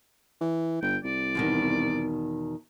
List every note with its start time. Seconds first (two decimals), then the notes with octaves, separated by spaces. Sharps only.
0.41 E3
0.82 G1 G5
1.04 C2 D5
1.35 E2 B2 D#3